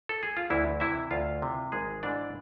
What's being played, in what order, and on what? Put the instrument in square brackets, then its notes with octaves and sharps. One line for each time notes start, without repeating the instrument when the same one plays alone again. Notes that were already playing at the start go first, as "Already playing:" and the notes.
[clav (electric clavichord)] A4
G#4
F4
D2 E3 E4
C3 E3 E4 E5
D2 F4 F5
C3 E3
G#1 G#3 G#4
G#2 E3 D4 D5